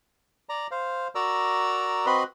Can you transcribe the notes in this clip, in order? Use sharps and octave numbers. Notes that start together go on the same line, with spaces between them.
D5 A#5
C5 F5
F#4 A#4 D5 A#5 E6
C4 F#4 B4 D#5 B5 C6